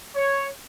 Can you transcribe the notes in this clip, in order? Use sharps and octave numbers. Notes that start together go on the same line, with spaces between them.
C#5